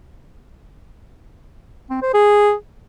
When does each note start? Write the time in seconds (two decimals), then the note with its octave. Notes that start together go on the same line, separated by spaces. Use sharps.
1.90 C4
2.02 C5
2.14 G#4